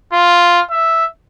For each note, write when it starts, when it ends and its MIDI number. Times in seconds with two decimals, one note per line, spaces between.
0.13 0.60 65
0.70 1.05 76